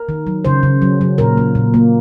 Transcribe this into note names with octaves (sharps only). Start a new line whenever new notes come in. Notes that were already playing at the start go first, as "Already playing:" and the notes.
Already playing: A#4
D#3
F#3
C#3 C5
C#3
F#3
F#3
A#2 A#4
A#3
A#2
A#3